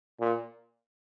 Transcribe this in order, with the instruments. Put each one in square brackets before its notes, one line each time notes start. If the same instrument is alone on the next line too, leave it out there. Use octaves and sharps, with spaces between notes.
[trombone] A#2